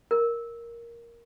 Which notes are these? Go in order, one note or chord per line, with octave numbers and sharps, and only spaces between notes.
A#4